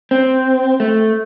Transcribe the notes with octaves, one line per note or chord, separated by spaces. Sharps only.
C4
A3